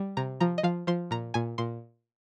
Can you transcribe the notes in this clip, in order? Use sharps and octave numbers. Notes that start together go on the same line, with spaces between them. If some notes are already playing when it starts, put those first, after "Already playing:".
Already playing: G3
C3 A#5
F3 A#5
D#5
F3 F5
F3 C6
A#2 A#5
A#2 G#5
A#2 C6